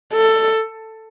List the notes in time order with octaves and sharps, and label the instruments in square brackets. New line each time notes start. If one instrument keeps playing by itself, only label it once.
[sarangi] A4